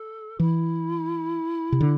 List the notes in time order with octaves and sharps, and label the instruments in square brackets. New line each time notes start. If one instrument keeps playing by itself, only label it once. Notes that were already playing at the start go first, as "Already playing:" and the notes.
Already playing: [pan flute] A4
[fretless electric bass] E3 [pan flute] E4
[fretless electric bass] C3
D3